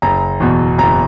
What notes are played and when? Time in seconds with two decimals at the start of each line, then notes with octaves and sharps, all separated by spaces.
0.02 F#1 A#5
0.40 E2 B2
0.78 F#1 A#5